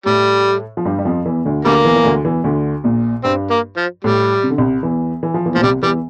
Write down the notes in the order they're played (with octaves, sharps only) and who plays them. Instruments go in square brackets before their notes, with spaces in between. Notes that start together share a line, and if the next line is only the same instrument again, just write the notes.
[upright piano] A2 A3 [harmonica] G3
[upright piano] F3
G2 G3
G3
F2 F3
E2 E3
D2 D3
[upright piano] D2 D3 [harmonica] G3 A#3
[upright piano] E2 E3
E3
D2 D3
E2 E3
D2 D3
A#1 A#2
[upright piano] G2 [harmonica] C4
[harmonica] A#3
F3
[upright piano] A2 [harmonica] G3
[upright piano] C3
D3
C2 C3
E2 E3
E3
F3
E2 E3
[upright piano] A#2 [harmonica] F3
[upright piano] C2 C3 [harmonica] G3
[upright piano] E2 E3 [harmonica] G3